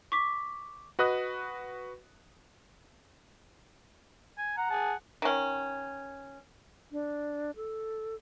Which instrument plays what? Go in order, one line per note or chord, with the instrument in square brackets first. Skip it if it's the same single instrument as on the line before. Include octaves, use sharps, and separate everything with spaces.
[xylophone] C#6 D6 B6
[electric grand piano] F#4 B4 D#5 D#6 F#6
[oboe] G#5
[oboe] F#5 [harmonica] A#5
[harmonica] G#4 A5
[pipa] D#3 C#4
[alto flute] D4
A4